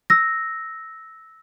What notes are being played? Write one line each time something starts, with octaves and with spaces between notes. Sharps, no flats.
E6 A#6